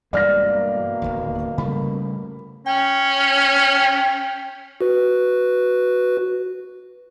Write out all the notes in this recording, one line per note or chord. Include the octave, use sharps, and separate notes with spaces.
G2 B2 E3 G#3 A#3 D5 F6 A#6
D1 G#1 D#2
C#3 G3 A3 B5
C#4 G5
F#4 B4